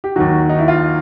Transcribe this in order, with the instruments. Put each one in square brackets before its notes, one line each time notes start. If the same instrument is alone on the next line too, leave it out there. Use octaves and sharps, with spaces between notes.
[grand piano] G4
D#2 D#3 F#3 F#4
D#4
E4
F4